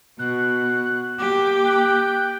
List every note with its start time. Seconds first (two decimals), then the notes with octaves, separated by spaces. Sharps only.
0.19 B2 F#4 F#6
1.18 A#3 G4 D6
1.65 G5 F#6